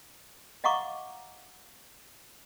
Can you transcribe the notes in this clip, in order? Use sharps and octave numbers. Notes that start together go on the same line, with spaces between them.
D#5 F5 F#5 A#5 C#6 D6